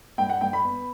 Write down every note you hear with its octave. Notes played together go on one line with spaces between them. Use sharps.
G2 G5
F#5
G2 G5
B5
B3